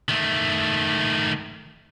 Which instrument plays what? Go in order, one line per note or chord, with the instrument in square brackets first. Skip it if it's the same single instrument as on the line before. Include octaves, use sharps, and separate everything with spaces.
[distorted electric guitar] D#3 A3